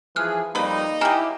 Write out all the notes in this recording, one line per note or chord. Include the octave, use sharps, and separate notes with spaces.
E3 F3 G#4 F6 F#6
F2 G3 A#3 D#4 B4 B5
F#3 A#3 E4 G4 G#5 A#5 F6